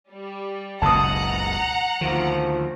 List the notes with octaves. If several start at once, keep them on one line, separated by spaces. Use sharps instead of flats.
G3
F#1 C#2 B2 F#5 A5 A#5 D#6
D2 D#3 F3